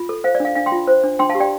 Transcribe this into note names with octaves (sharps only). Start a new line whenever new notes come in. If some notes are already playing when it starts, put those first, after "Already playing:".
Already playing: F4
A4
C5 F5
D5
D4 F5
D4 F5
G5 C6
F4
C5
D4
D4 G5 C6
F5 A5
G4
D5 G5